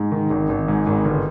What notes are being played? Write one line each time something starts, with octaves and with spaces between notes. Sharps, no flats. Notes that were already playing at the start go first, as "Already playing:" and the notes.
Already playing: G#2
D#3
G#1
G#1
G#2
G#1
G1